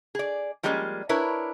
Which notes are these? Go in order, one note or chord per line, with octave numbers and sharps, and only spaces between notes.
G#4 D5
F3 G3 G#3 A#3 C4 C#4
D4 E4 A#4 B4 C#5